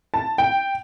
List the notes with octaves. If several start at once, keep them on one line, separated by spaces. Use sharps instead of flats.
A5
G5